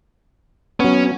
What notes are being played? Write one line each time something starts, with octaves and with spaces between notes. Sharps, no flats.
F#3 B3 C#4